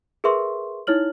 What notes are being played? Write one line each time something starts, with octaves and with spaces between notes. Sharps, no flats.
G#4 A#4 B4 E5 C6 C#6
D#4 E4 C#5 F6 F#7